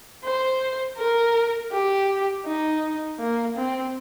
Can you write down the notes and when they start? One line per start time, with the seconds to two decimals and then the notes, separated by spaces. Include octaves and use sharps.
0.24 C5
0.97 A#4
1.72 G4
2.45 D#4
3.19 A#3
3.56 C4